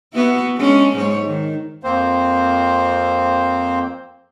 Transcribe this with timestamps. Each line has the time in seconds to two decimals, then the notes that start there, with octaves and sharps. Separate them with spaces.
0.13 B3 E4 F#4
0.57 G#3 C#4 D4
0.95 G#2 G#3 C#5
1.26 D#3
1.83 F2 A#3 C4 C5